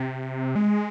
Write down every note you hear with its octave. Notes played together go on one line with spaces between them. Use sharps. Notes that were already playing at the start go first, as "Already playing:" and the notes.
Already playing: C3
G#3